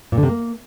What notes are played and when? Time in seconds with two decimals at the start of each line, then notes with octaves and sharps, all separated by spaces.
0.12 A#2
0.18 D3
0.23 C3
0.28 A#3